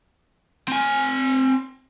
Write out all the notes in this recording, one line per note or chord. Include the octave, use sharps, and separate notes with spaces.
C4 G#5